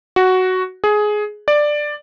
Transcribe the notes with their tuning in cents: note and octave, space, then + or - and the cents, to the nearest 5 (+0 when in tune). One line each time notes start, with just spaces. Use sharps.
F#4 +5
G#4 +15
D5 +10